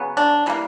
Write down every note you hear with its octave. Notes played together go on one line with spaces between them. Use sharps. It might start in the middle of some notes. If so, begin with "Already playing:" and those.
Already playing: C#3 F#3 B3
D4
E3 G3 A#3